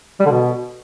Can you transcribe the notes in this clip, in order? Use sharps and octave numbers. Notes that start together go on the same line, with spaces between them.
G3
D3
B2